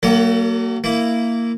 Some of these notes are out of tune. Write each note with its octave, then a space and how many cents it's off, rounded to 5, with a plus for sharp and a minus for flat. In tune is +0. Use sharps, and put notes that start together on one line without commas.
F#3 +35 A#3 -10 A4 +45
A#3 -10 E4 +0